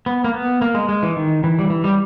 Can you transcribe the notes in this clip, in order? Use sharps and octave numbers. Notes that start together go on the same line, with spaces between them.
B3
A#3
B3
A#3
G#3
G#3
E3
D#3
E3
G3
E3
G3